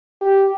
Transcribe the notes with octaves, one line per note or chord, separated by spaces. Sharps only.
G4